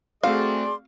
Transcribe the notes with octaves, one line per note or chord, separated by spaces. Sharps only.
A3 C4 F#4 G#4 D5 F5 C6